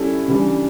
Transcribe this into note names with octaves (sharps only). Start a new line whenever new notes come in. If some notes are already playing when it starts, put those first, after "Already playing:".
Already playing: G3 C#4 E4 A4
C#3 E3 G3 D4